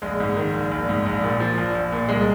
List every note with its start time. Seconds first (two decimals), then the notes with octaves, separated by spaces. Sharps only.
0.02 A#1 G#3
0.20 G#2
0.36 D#3
0.54 A#1
0.71 A#1
0.89 G#2
1.06 A#1
1.23 A#2
1.40 F3
1.58 A#1
1.75 A#1
1.92 A#2
2.08 C2 G#3